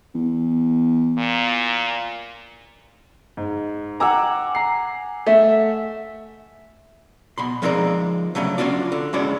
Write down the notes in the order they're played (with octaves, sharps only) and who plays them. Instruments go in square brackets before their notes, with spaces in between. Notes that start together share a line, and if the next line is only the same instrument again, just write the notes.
[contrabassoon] E2
[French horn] A#2
[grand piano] G#2
[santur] F#5 G#5 [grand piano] A#5 D6 E6
[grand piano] A#5 C7
[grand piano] A3 [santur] E5
[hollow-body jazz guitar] B2 B5 C6
F3 G#3 C4 D#4 A#4 D5
C#3 F#3 A3 C#4 D4
C#4 D4 F4 F#4 D5
D3
G#3 C#4 E4 F#4 C#5 D5